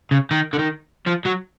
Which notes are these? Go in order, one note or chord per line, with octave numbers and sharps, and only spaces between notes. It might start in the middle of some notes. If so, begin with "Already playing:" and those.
C#3
D#3
D3
D#3
F3
F#3